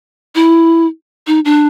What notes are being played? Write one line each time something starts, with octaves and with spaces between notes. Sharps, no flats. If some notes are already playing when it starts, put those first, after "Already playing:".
E4
D#4
D4